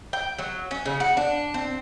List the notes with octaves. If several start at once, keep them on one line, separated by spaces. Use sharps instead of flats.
G5
F#3
C#4
C#3
F#4
D4
C4